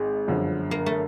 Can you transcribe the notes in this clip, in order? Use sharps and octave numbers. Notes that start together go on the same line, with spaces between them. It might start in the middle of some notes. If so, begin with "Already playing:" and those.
Already playing: G#1 G#3
G1 F#2 D3 F3
A#3
A3